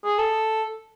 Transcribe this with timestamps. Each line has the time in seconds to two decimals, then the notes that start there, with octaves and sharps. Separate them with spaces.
0.05 G#4
0.19 A4